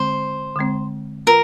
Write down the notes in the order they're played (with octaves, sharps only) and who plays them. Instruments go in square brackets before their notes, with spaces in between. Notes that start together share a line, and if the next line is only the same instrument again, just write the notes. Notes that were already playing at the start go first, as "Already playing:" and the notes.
Already playing: [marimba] D3 G#3 C4 [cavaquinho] C5
[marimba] D3 G#3 C4
[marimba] F4 [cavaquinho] A#4